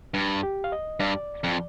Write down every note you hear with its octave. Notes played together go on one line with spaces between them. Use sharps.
G2
G4
F5
D#5
G2 D5
F2